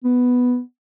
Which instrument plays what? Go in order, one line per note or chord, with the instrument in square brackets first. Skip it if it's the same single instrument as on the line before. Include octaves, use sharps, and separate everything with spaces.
[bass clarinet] B3